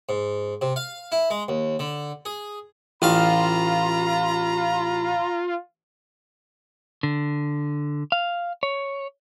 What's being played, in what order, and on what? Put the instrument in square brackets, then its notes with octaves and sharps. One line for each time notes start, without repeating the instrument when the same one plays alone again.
[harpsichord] G#2
C3
F5
E4
G#3
D#2
D3
G#4
[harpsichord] A1 F5 [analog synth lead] F4 [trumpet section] A#5 B5
[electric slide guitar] D3
F5
C#5